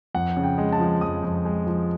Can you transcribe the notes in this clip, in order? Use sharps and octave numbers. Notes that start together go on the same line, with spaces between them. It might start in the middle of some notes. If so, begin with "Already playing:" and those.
F2 F#5
C#3
G5
G#3
A5
F3
F2 D#6
F2
G#3
F3